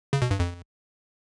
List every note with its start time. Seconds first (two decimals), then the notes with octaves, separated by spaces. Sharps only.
0.13 C#3
0.22 B2
0.31 G2
0.39 F2